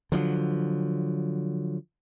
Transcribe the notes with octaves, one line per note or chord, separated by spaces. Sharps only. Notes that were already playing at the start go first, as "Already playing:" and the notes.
D3 F3 F#3